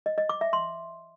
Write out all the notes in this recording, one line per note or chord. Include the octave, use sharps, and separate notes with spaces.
D#5
D#5
D6
E5
C6